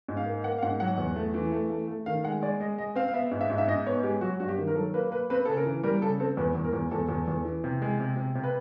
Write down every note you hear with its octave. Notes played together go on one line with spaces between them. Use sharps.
G#2
F5
A#3
A#3 F#5
F5
G#2 F#5
F#3 F#5
E2
A3
E3
A3
A3
A3
D#3 F5
G#3 F#5
G#3 D5
G#3 D#5
G#3 D#5
C4 F5
F5
B3 E5
G#2
E5
G#2
E5
G#2 D#5
B3 C#5
G#3 G4
F#3 F#4
G2 F#4
G4
D#3
A#4
F#3 A4
A#3 B4
A#3 B4
C4 B4
C#3 A4
A#4
E3
G3 A#4
C#3 A4
C4 A4
E2 B4
E2
A#4
E2
E2 A4
E2
E2
E3
C3
G#3
C3
C3
C3
B4